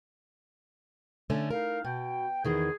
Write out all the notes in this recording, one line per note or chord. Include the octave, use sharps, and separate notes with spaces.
D3 A3 C#4
D#4 E4 A#4 F5
B2 G5
E2 D#3 E3 G#4